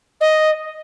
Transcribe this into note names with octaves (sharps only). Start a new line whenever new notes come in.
D#5